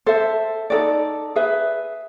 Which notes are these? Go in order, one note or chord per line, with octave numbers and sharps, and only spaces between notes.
A4 C5 E5
D#4 F#4 A4 D5
G#4 B4 E5